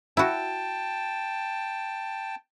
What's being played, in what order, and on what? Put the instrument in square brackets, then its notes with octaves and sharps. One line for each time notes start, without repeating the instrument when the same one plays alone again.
[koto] E4 F#4 [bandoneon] G5 A5